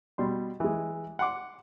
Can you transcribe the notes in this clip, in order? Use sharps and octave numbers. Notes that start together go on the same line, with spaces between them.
B2 G3 C6
E3 G#3
F#5 C6 D6